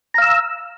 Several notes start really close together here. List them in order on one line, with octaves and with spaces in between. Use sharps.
A#5 F5 E6